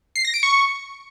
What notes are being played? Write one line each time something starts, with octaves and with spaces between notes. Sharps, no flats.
C7
A#6
D7
C#6